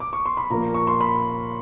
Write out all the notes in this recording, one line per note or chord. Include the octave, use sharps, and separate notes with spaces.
D6
C#6
C6
B5
A#2 F3 A#3 A#5
C#6
C6
B5